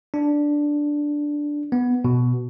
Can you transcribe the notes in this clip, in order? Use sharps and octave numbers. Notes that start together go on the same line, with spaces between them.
D4
B3
B2